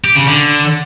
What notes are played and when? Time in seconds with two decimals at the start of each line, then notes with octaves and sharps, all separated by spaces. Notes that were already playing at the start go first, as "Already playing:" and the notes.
0.04 G4
0.15 C#3
0.26 D3